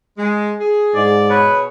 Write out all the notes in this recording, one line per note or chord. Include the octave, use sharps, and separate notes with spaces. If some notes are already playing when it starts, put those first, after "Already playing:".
G#3
G#4
G#2 D5
B2 G#4 B4 C#5